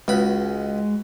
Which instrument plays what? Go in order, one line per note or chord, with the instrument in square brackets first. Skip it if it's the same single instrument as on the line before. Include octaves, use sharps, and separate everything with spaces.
[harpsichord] C#2 B5 [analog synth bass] G#3 [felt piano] F#4 B4